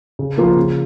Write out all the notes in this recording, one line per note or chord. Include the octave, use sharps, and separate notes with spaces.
C#3
F3 A#3 F4
C#3